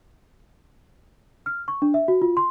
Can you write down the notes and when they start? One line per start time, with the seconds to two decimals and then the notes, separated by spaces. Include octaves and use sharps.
1.46 F6
1.68 C#6
1.82 D4
1.94 E5
2.08 F#4
2.22 F4
2.37 C6